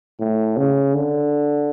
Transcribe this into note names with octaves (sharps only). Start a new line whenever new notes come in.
A2
C#3
D3